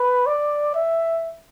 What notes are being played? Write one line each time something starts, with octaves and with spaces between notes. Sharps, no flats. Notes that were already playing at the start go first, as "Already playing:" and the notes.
Already playing: B4
D5
E5